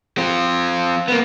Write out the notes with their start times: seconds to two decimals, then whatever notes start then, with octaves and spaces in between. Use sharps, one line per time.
0.18 C4 F4
1.08 A#3 B3